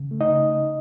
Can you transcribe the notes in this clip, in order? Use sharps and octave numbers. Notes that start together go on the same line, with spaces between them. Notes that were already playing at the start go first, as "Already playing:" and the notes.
Already playing: C#3
A3
D#4 D#5
C#3